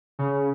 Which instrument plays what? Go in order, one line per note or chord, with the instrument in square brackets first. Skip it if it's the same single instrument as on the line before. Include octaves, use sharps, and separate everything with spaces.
[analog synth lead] C#3